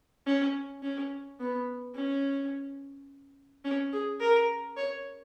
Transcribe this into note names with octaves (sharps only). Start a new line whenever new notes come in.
C#4
C#4
B3
C#4
C#4
G#4
A#4
C#5